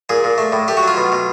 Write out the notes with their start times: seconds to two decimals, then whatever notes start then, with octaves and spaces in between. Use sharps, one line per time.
0.09 A#2 G#4
0.24 A#2
0.38 A3
0.52 A2
0.68 A3 G4
0.77 F#4
0.83 F#3 F4
0.97 B2
1.12 B2